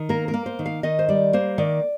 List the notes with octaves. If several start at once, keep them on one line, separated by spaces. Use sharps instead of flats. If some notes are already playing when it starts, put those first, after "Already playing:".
Already playing: D#3
A#3 A#4
A#4
A#3
C5
D#3
F5
D#3 D#5
C5
G3 D5
A#3 C5
D#3 D5